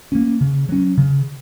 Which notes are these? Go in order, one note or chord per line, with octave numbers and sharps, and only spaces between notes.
A#3 C#4
C#3
F#3 C#4
C#3